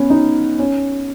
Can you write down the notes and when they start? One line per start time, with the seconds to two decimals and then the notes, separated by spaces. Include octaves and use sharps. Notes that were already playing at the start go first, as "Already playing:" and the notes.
Already playing: B3 C#4
0.10 D#4
0.59 C#4